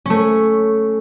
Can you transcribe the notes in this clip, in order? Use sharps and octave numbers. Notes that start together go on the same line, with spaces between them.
A3 C#4